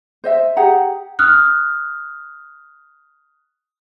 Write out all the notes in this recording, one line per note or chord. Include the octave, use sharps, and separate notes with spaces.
C5 D#5 E5
G4 G#4 F#5 A#5
D#6 F6 F#6